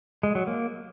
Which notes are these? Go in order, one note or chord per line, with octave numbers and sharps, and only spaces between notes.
G#3
F#3
A#3